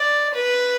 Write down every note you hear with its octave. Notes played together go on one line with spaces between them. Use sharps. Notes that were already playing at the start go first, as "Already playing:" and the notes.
Already playing: D5
B4